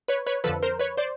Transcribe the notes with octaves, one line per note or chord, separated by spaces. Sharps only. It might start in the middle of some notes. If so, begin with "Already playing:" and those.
B4 C#5
B4 C#5
F2 D3 F3 A4 B4
A#4 C5
B4 C#5
C5 D5